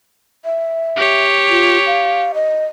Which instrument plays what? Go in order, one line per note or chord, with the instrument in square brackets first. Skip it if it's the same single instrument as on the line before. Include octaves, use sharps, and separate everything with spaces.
[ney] E5
[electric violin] G4 C#5
[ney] F4
F5
D#5